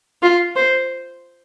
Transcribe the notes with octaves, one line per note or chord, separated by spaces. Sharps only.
F4
C5